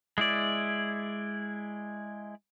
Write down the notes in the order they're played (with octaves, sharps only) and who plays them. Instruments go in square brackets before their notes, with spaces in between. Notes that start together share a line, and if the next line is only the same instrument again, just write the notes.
[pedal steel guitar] G#3 E4 D5